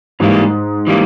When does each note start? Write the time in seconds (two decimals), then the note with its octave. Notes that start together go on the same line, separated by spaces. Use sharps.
0.20 G#2 E3 G3 A#3
0.87 E3 G3 A#3